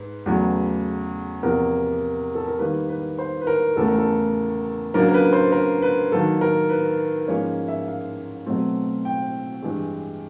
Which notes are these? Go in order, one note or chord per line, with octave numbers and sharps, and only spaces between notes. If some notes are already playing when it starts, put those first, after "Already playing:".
Already playing: G#2 B4
E2 C#3 F#3 A3
E2 C3 F3 A#3 A#4
A4
A#4
D#3 G3 A#3 B4
B4
C5
B4
A#4
E2 C#3 E3 A3 A4
A#4
A4
C#3 F#3 A#3 D4 A#4
A#4
B4
C5
A#4
B4
D#3 F#3 A#3 A4
A#4
B4
G#2 F3 A#3 C#4 C#5
E5
F5
B2 F#3 A3 C4
G5
G2 E3 G#3